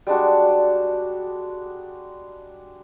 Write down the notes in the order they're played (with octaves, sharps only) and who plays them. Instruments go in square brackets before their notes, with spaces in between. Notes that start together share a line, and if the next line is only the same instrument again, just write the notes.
[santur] G3 G#3 D4 F#4